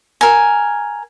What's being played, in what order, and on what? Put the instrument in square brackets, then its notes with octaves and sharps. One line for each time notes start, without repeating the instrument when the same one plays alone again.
[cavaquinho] A#4 G#5